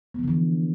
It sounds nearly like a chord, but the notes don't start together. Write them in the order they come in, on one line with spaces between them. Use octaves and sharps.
B3 F3 D3 E3